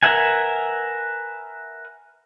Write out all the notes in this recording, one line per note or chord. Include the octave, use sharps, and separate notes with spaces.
A#4 B4 E5 F#5 G#5